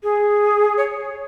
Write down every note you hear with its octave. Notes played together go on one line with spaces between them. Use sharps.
G#4
C#5